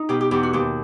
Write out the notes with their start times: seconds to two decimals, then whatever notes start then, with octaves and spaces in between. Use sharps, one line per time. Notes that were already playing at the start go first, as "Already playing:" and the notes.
Already playing: D#4
0.09 B2 G4
0.21 G4
0.31 E2 G4
0.43 F#4
0.53 D#2 G4